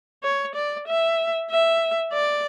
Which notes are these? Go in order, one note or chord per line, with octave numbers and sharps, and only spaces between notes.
C#5
D5
E5
E5
D5